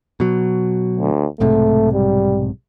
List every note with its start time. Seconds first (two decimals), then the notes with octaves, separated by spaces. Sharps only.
0.20 B2 F#3
0.98 D2
1.40 B1 G#2 C3 A3
1.93 G3